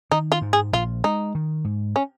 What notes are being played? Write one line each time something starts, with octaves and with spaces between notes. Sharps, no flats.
D#3 D#4
F4
G#2
G#4
A#1 F4
G#3 D#4
D#3
G#2
C#4